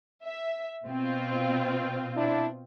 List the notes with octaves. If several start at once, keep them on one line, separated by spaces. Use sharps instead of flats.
E5
B2 C4 F4
D4 E4